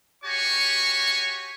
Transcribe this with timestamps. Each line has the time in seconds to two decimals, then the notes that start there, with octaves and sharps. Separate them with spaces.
0.24 F#4 G4 C#5 G#5 C#6